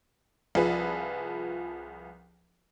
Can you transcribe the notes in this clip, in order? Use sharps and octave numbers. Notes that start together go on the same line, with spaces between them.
C2 F3 G#4 B4